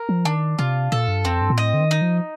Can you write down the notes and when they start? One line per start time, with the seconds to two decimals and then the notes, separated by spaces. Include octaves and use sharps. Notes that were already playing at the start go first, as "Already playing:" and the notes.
Already playing: A#4
0.09 F3
0.25 D#3 D4
0.59 C3 F4
0.92 A#2 A4
1.08 G2
1.25 F2 C4
1.41 G2
1.50 A#2
1.58 A2 D#5
1.74 D3
1.81 D#3
1.91 D#4
2.02 F3